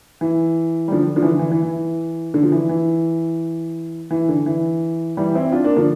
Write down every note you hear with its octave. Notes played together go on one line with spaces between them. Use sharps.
E3
G3
D3 F3
D3 F3
E3
D3
E3
E3
E3
D3
F3
E3
E3
E3
D3
E3
E3 G3
C4 E4
D4 F4
A#3 D4
D3 F3